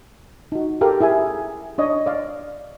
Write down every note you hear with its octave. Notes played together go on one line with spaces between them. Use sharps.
D#4 F#4
G4 A4 A#4 F5
E4 G#4 E5 G#5
D4 C#5 D#5
D5 F5